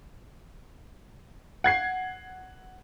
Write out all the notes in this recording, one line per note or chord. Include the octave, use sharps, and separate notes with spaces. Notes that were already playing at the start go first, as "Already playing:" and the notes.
F#5 G#6 C7